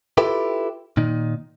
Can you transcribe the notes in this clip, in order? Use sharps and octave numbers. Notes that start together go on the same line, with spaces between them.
E4 F4 G4 A4 B4
A#2 D#3 D#4